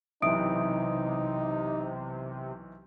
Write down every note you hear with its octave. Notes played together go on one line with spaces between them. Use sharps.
B1 C3 E3 D#4 E5 D#6 D7